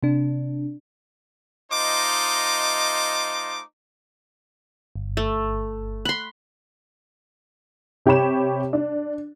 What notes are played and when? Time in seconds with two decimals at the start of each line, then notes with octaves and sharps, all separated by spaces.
0.03 C3 D4
1.72 A3 D#4 F4 C5 D#5 D6
4.96 G1
5.17 A3
6.05 B5 C6 F#6
8.06 C3 G4 C#5 B5 E7
8.73 D4